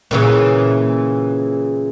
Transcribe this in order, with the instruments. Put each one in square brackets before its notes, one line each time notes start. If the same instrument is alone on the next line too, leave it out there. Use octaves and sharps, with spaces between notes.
[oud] A#2 C#3 E3